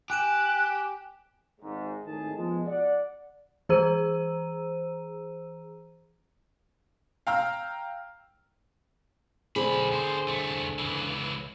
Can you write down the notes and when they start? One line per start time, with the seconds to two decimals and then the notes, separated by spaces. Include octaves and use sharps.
0.10 G4 G#5 F#6 D7 E7
1.61 G#1 G#2
2.06 G#1 A2 D#3 A3 G#4 A5
2.37 B2 F3 G#3
2.66 D5 F#5
3.69 E3 G#4 C5 A#5 E6 D#7
7.27 F5 G5 A#5 E6 F6
9.56 B1 D3 C4 G#4 B5
9.93 B3 C5
10.28 C2 A3
10.79 C#2 E3